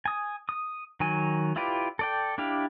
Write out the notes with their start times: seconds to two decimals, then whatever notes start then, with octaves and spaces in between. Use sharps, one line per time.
0.06 G#5 D#6
0.49 D#6
1.00 D#3 F#3 G#5
1.56 E4 F4 G4 B4 D5
1.99 A4 D5 G5
2.38 D4 E4 G4 F5